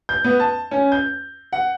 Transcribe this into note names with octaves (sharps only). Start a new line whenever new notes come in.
G6
B3
A5
C#4
G6
F#5